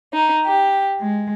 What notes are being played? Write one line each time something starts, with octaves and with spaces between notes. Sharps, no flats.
D#4
G4
G#3